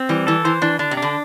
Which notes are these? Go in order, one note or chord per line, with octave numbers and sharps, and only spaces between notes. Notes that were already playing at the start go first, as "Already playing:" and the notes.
Already playing: C4
E3 G3
E3 A4
E3 C5
E3 D4
D3 D4
C3
D4
D3